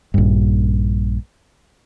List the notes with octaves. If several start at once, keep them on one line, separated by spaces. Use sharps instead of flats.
A#1 G2